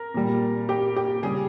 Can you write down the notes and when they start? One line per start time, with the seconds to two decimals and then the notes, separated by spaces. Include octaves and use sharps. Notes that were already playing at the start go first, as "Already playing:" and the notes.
Already playing: A#4
0.14 A#2 G3
0.69 G4
0.96 G4
1.23 C#3 G3 G#4